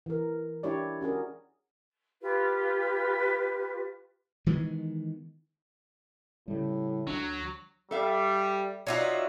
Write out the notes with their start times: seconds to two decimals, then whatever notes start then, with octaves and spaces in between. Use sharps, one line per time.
0.06 E3 A#4
0.63 D4 E4 G4 C#5 D5
1.01 C#4 F#4 G#4 A#4
2.21 F4 G4 B4
4.46 D#3 E3 G#3 B3
6.48 A2 C#3 G3
7.07 D2 F#3 D4
7.91 G3 A4 E5 F5
8.87 F#3 D#4 F4 F#4 D5 E5